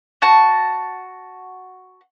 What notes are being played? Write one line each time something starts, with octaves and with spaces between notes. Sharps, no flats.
F#4 A5